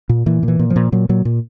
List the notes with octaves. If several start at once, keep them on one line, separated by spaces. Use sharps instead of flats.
A#2
A#2 E3
A#2
E3
A#2
F3
A#2
A#2 F#3
A#2 F#3
A#2